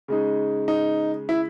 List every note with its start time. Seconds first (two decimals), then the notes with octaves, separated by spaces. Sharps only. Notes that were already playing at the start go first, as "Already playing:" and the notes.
0.08 C#3 G#3 D#4
0.68 D#4
1.29 E4